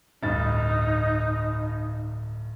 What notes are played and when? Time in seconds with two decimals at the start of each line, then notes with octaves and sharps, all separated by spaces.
0.23 D1 G2 D#4 A6